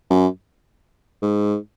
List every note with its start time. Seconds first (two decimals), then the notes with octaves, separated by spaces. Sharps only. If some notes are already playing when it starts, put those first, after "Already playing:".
0.10 F#2
1.22 G#2